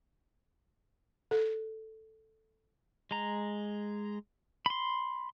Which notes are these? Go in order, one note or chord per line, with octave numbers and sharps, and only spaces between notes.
A4
G#3 A#5
B5 C6